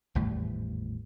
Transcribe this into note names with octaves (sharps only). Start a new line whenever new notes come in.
G#1 E2 A2 G3